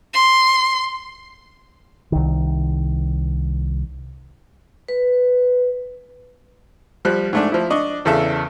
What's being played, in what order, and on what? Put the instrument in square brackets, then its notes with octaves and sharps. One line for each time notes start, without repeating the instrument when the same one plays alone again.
[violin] C6
[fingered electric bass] C2 D#3
[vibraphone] B4
[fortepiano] F3 G3 F#6
G#2 A3 D4
F3 E4
D4 D#5 C#6
E2 C#3 A4 E5